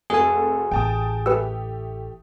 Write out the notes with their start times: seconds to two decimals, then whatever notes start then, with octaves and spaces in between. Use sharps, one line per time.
0.10 F1 F#4 G#4 A4 G#5
0.71 A1 G5 A5 D#6
1.26 A3 G4 A4 B4 E6